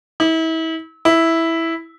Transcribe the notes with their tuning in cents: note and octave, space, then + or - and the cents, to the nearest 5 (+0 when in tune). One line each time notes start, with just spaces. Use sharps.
E4 -35
E4 -5